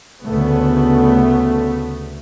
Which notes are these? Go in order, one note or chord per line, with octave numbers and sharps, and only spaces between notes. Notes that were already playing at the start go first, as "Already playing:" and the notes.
D2 C#3 A3 B3